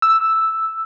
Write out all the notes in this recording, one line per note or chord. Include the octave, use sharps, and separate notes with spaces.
E6